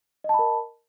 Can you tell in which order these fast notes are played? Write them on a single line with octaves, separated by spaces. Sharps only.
D#5 A5 B5 A#4